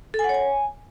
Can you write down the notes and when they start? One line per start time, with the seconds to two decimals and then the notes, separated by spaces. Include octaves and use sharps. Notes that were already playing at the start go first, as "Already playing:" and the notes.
0.14 A4
0.19 G#5
0.24 F#5
0.29 C#5
0.34 G#5